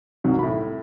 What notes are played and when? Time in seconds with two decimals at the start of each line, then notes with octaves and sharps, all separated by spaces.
0.24 C2 D#3 F#3
0.39 A2 B5